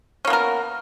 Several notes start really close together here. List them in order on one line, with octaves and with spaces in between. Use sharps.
C#4 A#3 B3 A#4